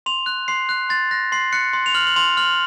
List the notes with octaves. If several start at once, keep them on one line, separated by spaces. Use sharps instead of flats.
C6 F7
F#6
C6 C7
F#6
C6 A6
F#6 A#6
C6 C7
F#6 C#7
C6
F7
F6 F#7
F#7
C6 F7
F6 F#7